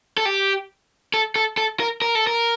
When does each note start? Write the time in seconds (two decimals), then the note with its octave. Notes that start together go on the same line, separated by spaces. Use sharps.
0.17 A4
0.25 G4
1.14 A4
1.36 A4
1.57 A4
1.80 A#4
2.02 A#4
2.15 A4
2.27 A#4